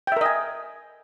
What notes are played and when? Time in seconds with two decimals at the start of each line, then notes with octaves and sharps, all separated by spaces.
0.07 G5
0.12 E5
0.17 A#4
0.21 D#5
0.26 G#5